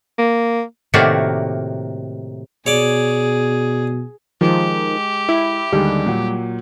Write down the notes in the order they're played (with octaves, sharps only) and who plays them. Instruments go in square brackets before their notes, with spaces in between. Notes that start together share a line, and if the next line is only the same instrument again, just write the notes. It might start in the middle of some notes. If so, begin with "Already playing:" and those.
[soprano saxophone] A#3
[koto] A2 C3 D#3 A#3 F#4 D5
[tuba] B2 [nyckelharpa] G#4 [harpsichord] C#5 D5
[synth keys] D#3 F3 [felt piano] G#3 [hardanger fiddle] G4
[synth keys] E4
[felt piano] D#2 D3 G#3 [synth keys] G3
[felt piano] A#2 F#3 F#5